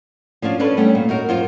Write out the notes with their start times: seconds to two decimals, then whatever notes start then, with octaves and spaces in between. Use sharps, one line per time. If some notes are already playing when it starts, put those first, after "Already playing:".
0.42 F3 C#4 D4 F4
0.60 C#4 D4 A4 B4
0.77 G3 A3 B3 C#4
0.95 A#2
1.09 D#4 F#4 A#4
1.29 F#2 F4 C5